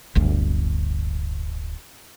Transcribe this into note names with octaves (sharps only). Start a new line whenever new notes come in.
D1 G1 D2